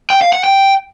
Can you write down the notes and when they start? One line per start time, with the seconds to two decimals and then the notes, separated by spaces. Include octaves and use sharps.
0.10 G5
0.21 F5
0.33 F#5
0.44 G5